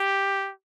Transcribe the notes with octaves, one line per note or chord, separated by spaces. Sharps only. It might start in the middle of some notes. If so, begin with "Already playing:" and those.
Already playing: G4